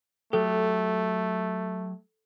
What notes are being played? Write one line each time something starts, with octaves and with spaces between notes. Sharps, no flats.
F#3 A3 G4 A4